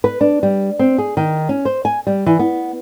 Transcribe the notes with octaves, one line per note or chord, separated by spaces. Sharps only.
B4
D4
G3
C4
G#4
D#3
C#4
C5
G#5
G3
E3
B3